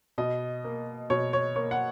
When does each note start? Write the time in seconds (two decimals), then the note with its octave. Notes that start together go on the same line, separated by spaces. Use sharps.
0.18 B2 D#5
0.64 A#3
1.10 B2 C#5
1.33 C#5
1.56 A#3 C#5
1.71 F#5